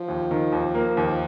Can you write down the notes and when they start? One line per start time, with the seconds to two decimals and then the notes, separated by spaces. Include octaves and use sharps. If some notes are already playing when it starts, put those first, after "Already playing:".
Already playing: F3
0.08 D#2
0.31 D#3
0.52 D#2
0.75 A#3
0.97 D#2